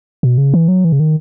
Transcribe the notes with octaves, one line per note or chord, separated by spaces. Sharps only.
B2
C#3
E3
F#3
E3
C#3
D#3